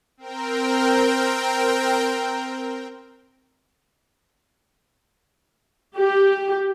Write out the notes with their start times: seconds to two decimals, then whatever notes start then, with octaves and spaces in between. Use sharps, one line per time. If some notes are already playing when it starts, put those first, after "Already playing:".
0.17 C4 A#4 G5
5.96 G4